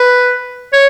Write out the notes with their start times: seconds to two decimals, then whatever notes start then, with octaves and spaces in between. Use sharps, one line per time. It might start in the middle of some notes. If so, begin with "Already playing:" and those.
Already playing: B4
0.73 C#5